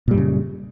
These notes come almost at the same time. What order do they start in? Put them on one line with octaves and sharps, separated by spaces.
A#2 G3 F#2 C#3